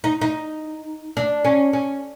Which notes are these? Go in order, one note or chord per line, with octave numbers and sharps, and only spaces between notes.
D#4
D#4
D4
C#4
C#4